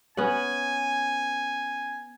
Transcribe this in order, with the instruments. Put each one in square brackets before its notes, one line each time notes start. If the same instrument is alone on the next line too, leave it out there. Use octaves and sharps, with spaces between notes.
[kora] B3 C#4 F#5 [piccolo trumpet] G#5